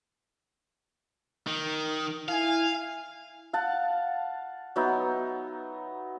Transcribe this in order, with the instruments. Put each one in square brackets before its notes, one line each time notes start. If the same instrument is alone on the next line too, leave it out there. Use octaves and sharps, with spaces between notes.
[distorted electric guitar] D#3
[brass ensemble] E4 G#5 [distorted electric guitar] F5
[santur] F5 F#5 A5
F#3 B3 D#4 E5